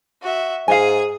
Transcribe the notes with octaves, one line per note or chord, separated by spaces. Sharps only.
F#4 E5
G#2 G#4 F5 G#5